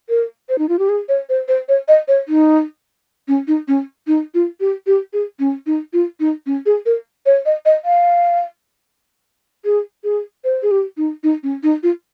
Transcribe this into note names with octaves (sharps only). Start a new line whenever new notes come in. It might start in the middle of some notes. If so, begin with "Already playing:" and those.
A#4
C5
D#4
F4
G4
G#4
C#5
C5
C5
C#5
D#5
C#5
D#4
C#4
D#4
C#4
D#4
F4
G4
G4
G#4
C#4
D#4
F4
D#4
C#4
G#4
A#4
C#5
D#5
D#5
F5
G#4
G#4
C5
G#4
G4
D#4
D#4
C#4
D#4
F4